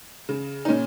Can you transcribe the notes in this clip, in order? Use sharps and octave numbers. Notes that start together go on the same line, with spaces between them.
C#3
D#4
A#2 C#4